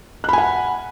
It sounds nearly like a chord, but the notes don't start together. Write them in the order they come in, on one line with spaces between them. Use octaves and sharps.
F#6 B5 G#5 F#5